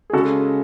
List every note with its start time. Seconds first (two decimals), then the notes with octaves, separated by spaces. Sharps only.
0.10 G#4
0.13 C#3 G#3 F#4 A4